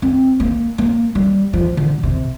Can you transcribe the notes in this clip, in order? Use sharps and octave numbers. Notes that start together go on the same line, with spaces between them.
C4
A#3
A#3
G3
F3
D3
C3